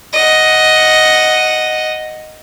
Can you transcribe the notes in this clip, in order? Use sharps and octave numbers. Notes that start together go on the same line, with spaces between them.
D#5 F#5